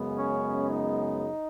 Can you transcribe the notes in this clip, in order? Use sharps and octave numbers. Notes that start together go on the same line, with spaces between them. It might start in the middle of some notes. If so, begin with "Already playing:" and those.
Already playing: F#2 C#3 G#3 B3
C#4
D#4